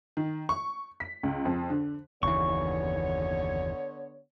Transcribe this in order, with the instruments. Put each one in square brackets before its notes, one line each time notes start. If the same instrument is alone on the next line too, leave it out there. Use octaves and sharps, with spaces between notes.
[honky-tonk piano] D#3
C#6
B6
C#2
F2
D3
[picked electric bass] F#1 D#2 E3 [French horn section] D3 B3 C#5 [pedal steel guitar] C#6